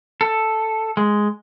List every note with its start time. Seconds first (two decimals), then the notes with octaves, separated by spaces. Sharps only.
0.21 A4
0.97 G#3